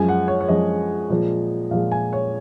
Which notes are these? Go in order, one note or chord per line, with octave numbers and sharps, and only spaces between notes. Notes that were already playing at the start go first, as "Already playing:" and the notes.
Already playing: F#2 F3 G#3 G#5
F#5
C#5
C#5
F#2 F3 G#3 D#5
A#2 F3 G#3
A#2 F3 G#3 F5
G#5
C#5